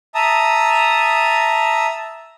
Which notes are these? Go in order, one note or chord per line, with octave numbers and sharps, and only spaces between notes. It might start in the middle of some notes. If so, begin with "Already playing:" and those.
E5 A5 A#5 D#6